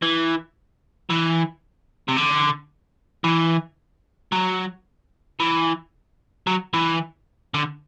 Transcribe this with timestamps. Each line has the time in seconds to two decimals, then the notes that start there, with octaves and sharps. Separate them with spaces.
0.02 E3
1.10 E3
2.09 C3
2.17 D3
3.24 E3
4.32 F#3
5.40 E3
6.47 F#3
6.74 E3
7.54 D3